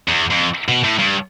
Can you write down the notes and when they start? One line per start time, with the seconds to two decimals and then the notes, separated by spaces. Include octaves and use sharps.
0.09 E2
0.31 F2
0.69 B2
0.84 A2
0.99 G2